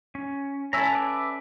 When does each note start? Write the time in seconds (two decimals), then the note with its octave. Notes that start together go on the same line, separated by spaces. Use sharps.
0.15 C#4
0.73 C#4 E4 A4 E5 A#5
0.93 B4 D5 E5